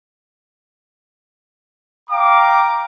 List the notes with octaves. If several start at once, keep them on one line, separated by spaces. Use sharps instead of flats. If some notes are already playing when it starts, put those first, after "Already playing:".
F5 G5 A#5 D6